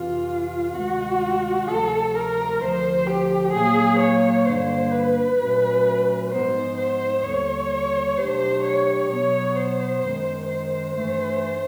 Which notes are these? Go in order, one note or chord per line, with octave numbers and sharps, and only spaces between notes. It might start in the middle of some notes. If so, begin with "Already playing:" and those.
Already playing: F2 C3 E3 F4
D2 C3 D#3 G#3 F#4
D2 C3 F3 A3 A4
A#4
D2 D3 F3 C5
G4
A#2 F#3 A#3 G#4
C#5
G2 D3 G3 A#3 D4 C5
B4
A#2 F#3 A3 C#4 F#4
G#2 F3 G#3 B3 C5
C5
D#2 D3 G3 C#5
B2 F#3 A3 D4 G4 C5
C#5
B2 F#3 B3 C#5
C5
F#2 D#3 G#3
C5
G2 E3 A3